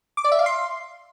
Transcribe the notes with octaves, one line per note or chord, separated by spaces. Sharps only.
D6
D5
E5
F5
C6